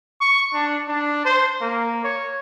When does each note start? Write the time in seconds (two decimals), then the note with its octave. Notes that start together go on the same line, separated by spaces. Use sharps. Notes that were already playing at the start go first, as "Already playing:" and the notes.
0.21 C#6
0.54 D4
0.88 D4
1.25 C5
1.61 A#3
2.04 C#5